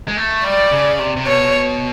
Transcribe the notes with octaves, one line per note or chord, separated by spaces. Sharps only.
G#3
A3
G3 D5
C#3
C3
C3
B2 C#5